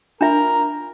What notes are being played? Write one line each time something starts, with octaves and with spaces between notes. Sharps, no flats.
D4 F4 A#4 E5